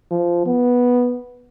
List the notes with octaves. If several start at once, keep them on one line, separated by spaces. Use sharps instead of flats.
F3
B3